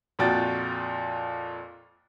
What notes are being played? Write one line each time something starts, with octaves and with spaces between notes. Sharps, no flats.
F2 A#2 F#4 G5 A6